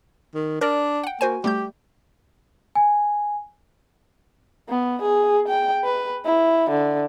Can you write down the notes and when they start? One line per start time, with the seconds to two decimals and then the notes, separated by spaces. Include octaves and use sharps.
0.35 D#3
0.61 D4 A#4 D5
1.03 F#5 G5
1.21 A#3 F#4 C5 G#5
1.44 G3 A3 G4 G6
2.75 G#5
4.69 B3
5.02 G#4
5.48 G5
5.84 B4
6.25 E4
6.70 D3